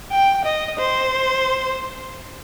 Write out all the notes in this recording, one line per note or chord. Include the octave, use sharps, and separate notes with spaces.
G5
D#5
C5